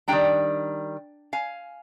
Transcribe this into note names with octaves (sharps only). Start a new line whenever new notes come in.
D#3 G3 D4 G5 A#5
F5 G#5